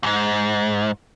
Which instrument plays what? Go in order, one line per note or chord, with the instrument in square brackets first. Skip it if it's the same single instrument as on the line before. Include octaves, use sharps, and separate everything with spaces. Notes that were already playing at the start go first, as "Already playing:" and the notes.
[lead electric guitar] E2 G#2